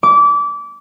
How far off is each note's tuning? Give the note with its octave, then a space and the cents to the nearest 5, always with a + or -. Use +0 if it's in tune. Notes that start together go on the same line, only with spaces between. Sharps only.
D6 -25